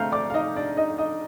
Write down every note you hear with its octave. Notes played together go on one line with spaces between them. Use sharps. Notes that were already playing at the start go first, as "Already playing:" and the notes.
Already playing: D3 A3 C4 F5 F6 G6
D5 D6
F5
D#4 D#5
D4 D5
D#4 D#5
D#4 D#5